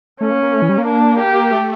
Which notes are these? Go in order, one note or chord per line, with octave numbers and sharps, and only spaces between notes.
A3 C#4
A#3
A#3
A3
E3
G3
A#3
D4
G4
A3